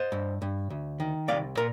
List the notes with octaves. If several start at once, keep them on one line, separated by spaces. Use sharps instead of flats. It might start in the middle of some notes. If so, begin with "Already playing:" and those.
Already playing: C5 D#5
G2
G2
D2
D#3
C2 D5 F5
A#2 A#4